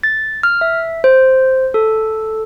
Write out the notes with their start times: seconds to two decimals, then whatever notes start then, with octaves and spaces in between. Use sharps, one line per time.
0.03 A6
0.43 F6
0.61 E5
1.04 C5
1.74 A4